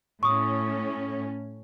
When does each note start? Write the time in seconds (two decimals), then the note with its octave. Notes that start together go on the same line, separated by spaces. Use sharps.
0.23 A2 C#4 C#6 D#6